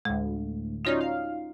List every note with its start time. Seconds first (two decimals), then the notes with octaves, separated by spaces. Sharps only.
0.05 D2 A2 G#3
0.85 C#4 D#4 F4 F#4 C#5 D5
1.00 F5